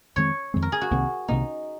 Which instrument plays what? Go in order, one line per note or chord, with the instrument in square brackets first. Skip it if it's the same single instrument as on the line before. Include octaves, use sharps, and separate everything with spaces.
[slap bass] F2 D#3 G#3 C4 [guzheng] C#5
[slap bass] F2 D#3 G#3 C4
[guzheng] A#4
G#4
F#4
[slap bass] C2 C3 D#3 A#3
[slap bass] C2 C3 D#3 A#3 [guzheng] D#4